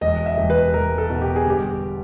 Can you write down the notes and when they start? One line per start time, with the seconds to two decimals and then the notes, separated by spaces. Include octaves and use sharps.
0.01 E1 D#5
0.26 E5
0.38 E1
0.50 B4
0.74 E1 A#4
0.98 A4
1.10 B2
1.22 G4
1.36 G#4
1.46 G1 G4